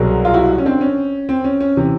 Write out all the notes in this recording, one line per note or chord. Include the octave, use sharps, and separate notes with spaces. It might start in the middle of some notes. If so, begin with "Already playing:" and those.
Already playing: C2 B2 F#3 G#4 A#4
F4
E4 F#4
C#4
C4 D4
C#4
C4
C#4
C#4
C3 E3